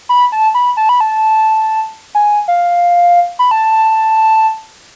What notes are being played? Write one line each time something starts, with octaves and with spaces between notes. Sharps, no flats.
B5
A5
B5
A5
B5
A5
G#5
F5
B5
A5